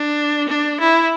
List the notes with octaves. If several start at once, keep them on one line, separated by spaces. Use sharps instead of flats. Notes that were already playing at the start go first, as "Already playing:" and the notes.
Already playing: D4
D4
E4